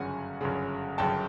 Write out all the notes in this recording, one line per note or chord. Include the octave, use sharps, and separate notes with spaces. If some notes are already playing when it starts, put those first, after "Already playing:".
Already playing: G1 F#2 C#3 F#5 G#5
G1 F#2 C#3
G1 F#2 C#3 G5 A5